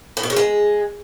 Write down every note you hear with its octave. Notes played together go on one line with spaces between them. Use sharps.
A2
B2
C#3
G#3